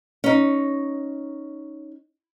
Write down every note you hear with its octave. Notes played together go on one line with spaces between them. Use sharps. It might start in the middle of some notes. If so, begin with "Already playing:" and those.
C#4 D#4